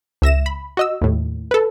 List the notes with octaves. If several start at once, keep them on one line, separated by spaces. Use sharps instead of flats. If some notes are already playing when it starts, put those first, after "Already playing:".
C#2 E5 A#6 E7
B5
F#4 D#5 E6
D#2 A2
A4 B4